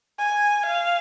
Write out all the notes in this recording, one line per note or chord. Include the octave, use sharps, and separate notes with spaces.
G#5
F5